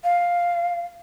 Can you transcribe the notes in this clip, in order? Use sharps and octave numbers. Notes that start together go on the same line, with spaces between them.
F5